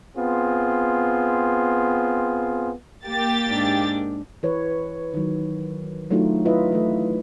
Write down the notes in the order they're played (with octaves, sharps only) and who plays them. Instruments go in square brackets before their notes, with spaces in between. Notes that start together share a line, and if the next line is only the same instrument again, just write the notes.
[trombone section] B3 C4 F4 G#4
[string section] A#3 G4 A6
[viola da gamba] G#2 D4
[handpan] E3 B4 C#5
D#3 F#3
F#3 A3 D4 D#4 F4
E4 F4 B4 D#5 E5
E3 A3